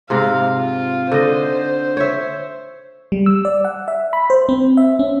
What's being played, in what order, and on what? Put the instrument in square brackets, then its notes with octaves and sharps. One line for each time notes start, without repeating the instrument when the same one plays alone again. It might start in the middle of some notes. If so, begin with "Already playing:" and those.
[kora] G#2 C3 C4 [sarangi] F5
[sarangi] F4
[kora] D3 D#5 [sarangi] C5
[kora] C#5 E5
[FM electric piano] G3
E6
D5
F#5
E5
B5
C5
C4
E5
C#4